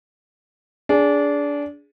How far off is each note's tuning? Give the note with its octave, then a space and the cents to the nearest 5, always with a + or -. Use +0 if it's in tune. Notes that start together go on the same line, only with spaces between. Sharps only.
D4 -20 G#4 +0